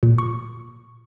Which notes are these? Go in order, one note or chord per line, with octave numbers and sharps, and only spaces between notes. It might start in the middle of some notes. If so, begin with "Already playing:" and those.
A#2
C#6